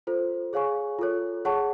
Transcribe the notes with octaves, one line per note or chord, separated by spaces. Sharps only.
F4 A4 C5
G#4 C#5 F5 G#5 C#6
F4 A4 C#5
G#4 C#5 F#5 A5 C#6